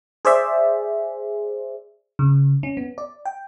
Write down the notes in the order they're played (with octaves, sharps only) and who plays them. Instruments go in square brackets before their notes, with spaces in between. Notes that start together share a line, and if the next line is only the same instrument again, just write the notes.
[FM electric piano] G#4 C5 D5 E5
C#3
C#4
B3
D5
G5